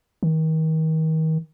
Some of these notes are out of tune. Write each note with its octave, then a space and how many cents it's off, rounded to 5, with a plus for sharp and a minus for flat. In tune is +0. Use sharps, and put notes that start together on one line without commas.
D#3 +35